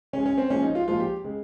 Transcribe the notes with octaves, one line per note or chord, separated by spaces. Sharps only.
C#3 G#3 C#4
C#4
C4
A#2 F3 G#3 C#4
D#4
F4
A#2 F3 G#3 F4
G4
C#3 G#3